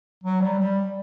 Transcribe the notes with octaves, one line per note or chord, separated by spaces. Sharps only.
F#3
G3
G3